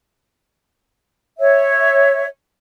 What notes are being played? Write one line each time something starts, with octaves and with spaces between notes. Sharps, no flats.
C#5 E5